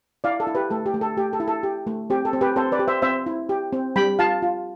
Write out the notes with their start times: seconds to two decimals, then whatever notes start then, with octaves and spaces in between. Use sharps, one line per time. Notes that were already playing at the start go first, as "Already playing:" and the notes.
0.24 E4 D5 F5
0.40 A4
0.47 E4
0.55 G4 B4
0.70 A3 A4
0.86 G4
0.94 A3
1.01 A4
1.17 A3 G4
1.33 A4
1.40 E4
1.48 A4
1.63 G4
1.87 A3
2.10 C4 G4
2.25 A4
2.33 C4
2.41 G4 B4
2.56 C4 A4 C5
2.72 B4 D5
2.79 G4
2.88 C5 E5
3.02 C4 C5 E5
3.26 E4
3.49 G4
3.73 C4
3.96 G3 G5 B5
4.19 F4 F5 A5
4.42 F4